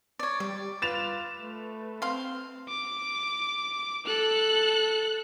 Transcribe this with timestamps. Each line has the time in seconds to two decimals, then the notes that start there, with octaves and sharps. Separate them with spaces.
0.19 C#5 D5
0.40 G3 D5
0.82 F4 B4 A6 E7 F7
1.39 A3
2.02 C4 F5 C6
2.69 D6
4.06 A4 F#6